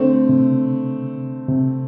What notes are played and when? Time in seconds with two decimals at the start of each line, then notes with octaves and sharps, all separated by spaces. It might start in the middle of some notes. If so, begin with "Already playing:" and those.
Already playing: D3 A3 C4
0.29 C3
1.48 C3